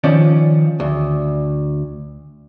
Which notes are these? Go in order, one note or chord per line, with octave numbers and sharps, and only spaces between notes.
D#3 F3 C#4 D5
D2